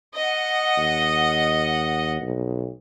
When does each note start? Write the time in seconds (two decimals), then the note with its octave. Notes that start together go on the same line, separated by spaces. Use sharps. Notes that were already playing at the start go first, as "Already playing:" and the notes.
0.14 D#5 F#5
0.78 D#2
2.22 B1